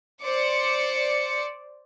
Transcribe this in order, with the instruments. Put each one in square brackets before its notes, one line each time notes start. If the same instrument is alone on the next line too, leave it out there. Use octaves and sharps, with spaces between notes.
[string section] C5 D5 C#7